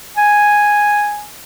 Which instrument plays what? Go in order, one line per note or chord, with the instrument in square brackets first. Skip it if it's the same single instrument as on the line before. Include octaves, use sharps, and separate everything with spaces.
[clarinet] G#5